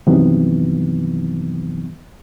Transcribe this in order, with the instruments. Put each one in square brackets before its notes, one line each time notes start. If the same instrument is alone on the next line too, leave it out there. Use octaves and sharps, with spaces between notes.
[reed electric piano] G2 C3 D#3 E3 F#3 B3